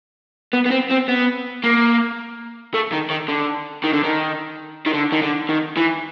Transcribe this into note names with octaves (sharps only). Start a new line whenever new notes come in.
B3
B3
C4
C4
B3
A#3
A3
D#3
D#3
D3
D#3
D3
D#3
D#3
D3
D#3
D3
D#3
E3